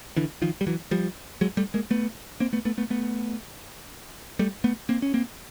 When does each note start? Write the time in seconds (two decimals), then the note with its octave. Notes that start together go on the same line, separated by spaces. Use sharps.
0.16 D3 E3
0.42 D#3 F3
0.61 G3
0.67 E3 F#3
0.91 F3 G3
1.41 F#3 G#3
1.57 G3 A3
1.74 G#3 A#3
1.91 A3 B3
2.40 A#3 C4
2.53 A3 B3
2.65 A3 B3
2.78 A3 B3
2.90 A3 B3
4.39 G3 A3
4.64 A3 B3
4.89 A#3 C4
5.02 C#4
5.14 A#3 C4